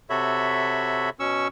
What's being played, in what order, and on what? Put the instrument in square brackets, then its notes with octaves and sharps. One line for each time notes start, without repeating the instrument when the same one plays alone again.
[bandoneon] C3 F#4 A4 C#5 E5 B5
B2 C#4 C#6 E6